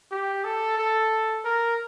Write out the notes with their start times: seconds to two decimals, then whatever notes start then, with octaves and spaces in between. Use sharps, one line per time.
0.11 G4
0.44 A4
0.78 A4
1.45 A#4